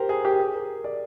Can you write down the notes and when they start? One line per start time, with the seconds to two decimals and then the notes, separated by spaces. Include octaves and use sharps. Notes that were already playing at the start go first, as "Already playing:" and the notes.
Already playing: G4 A#4 C5
0.09 G#4
0.25 G4
0.39 G#4
0.54 A#4
0.84 D5